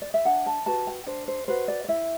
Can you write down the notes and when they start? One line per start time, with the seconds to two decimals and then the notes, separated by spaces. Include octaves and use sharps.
0.02 D5
0.14 E5
0.25 D4 F#5
0.46 A5
0.66 F#4 B4 A5
0.87 G5
1.07 D4 C5
1.28 C5
1.48 F#4 B4 C5
1.68 D5
1.84 D5
1.88 E4 E5